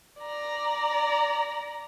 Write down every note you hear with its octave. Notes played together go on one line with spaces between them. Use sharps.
D5 A#5